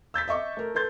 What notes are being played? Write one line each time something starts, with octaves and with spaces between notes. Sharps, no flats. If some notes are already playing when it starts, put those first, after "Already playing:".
E6 G6 A6 B6
D#5 E5 C#6 D6
A3 A#4
A4 B4 C6 G6 A6